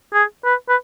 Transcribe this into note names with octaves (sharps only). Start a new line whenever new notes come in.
G#4
B4
B4